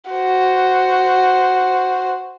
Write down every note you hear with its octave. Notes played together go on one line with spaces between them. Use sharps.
F#4 C5